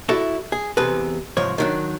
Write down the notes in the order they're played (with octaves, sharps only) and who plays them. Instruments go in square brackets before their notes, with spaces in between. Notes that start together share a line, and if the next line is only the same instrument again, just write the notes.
[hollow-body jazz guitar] E4 F#4 A4 D5 E5
G#4
E2 C3 G#4 A4 B4
C2 G#2 F3 C#5
D#3 F#3 D4